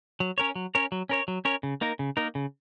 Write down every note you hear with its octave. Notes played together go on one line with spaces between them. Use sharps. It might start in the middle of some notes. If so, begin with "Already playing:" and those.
F#3
C#4 A#4 C#5
F#3
C#4 A#4 C#5
F#3
C#4 A#4 C#5
F#3
C#4 A#4 C#5
C#3
A#3 D#4 A#4
C#3
A#3 D#4 A#4
C#3